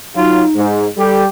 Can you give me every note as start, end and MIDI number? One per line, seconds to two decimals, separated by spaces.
0.15 0.43 54
0.15 0.64 63
0.15 0.43 65
0.55 0.86 44
0.97 1.26 55
0.97 1.26 67
0.97 1.22 69